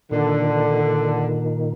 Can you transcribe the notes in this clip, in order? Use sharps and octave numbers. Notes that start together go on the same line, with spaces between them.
A#2 D3 D#3